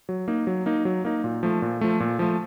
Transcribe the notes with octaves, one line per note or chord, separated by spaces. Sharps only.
F#3
A#3 D#4
F#3
A#3 D#4
F#3
A#3 D#4
A#2
F3 A3
A#2
F3 A3
A#2
F3 A3